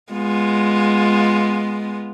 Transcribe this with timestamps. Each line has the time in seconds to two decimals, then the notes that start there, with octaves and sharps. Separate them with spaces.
0.12 G#3 B3 F4